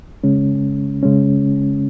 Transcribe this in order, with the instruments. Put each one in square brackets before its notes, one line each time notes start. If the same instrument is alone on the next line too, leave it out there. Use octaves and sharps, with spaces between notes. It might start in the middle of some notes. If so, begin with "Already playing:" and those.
[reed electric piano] C#3 G#3 C#4
C#3 G#3 C#4